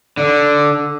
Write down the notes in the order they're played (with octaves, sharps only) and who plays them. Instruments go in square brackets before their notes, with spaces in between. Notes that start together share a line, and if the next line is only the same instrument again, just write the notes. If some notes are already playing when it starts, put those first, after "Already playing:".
[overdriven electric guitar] D3